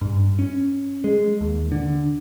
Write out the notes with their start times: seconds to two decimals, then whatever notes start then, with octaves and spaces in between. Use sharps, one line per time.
0.01 G2
0.39 C#4
1.04 G#3
1.41 D#2
1.72 D3